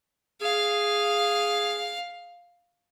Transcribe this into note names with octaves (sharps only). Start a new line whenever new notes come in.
G#4 F5